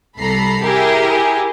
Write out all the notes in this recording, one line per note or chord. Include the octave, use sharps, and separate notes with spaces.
C2 A4 A#5 B5 C7
E4 G4 G#4 A#4